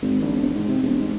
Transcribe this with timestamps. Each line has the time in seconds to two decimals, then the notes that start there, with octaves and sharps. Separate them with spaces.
0.02 G#1
0.22 A#1
0.35 E1
0.55 G#2
0.69 C3
0.83 E1
1.00 G#2